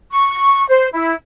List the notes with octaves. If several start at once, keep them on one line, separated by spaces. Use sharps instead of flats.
C#6
C5
E4